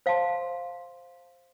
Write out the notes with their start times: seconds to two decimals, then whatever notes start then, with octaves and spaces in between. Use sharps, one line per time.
0.06 C5 F5 A5 C6